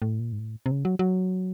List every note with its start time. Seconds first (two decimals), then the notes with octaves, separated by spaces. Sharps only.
0.02 A2
0.20 A#2
0.32 G#2
0.39 A2
0.66 C3
0.71 C#3
0.85 F#3
0.99 F#3